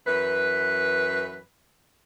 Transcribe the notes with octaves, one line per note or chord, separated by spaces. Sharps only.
F#2 E3 B4